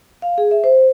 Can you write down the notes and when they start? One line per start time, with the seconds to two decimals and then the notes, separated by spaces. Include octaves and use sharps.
0.22 F5
0.38 G#4
0.51 E5
0.64 C5